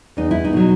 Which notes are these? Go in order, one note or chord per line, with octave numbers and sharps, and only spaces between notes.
E2 D#4
E4
D#4
B2 F#3